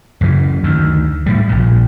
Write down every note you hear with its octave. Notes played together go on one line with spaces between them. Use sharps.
F#2 C#3 E3
D2 D#3
A2 G3
A#1 A#2